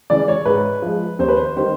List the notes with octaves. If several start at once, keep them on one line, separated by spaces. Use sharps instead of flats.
C#3 E3 G#3 D5
C#5
G#2 B4
F3 G#3
D#2 C5
B4
C5
D#3 G3 C4 C5